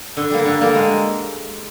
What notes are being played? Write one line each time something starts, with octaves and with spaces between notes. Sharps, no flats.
D3
G3 A#3
D3
G3 A#3
G#3